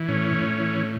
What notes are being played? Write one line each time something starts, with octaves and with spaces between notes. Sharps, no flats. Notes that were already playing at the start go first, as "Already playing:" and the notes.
Already playing: E3
A2 C#4
A2
E3